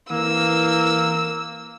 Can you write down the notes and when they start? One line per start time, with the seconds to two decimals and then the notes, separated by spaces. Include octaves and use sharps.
0.11 E3 A#3 E6